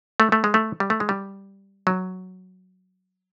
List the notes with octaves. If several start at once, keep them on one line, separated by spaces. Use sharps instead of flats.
A3
A3
G#3
A3
G3
A3
G#3
G3
F#3